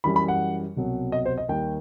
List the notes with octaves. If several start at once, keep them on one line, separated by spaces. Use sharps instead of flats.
F#2 E3 G3 B5
B5
F#5
C2 B2 F#3
D#5
C5
D#5
D#2 D#3 G3 G5